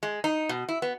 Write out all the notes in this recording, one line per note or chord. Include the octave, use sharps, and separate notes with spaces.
G#3
D#4
B2
E4
B3